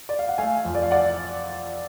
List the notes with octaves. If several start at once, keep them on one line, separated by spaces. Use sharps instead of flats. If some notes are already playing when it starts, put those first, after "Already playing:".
D5
F5
F#5
A3 F5 G#5
F2
D5
F5
D5 F#5